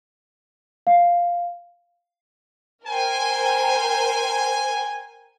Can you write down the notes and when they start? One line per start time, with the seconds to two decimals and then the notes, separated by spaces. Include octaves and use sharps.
0.87 F5
2.87 A#4 C5 G5 G#5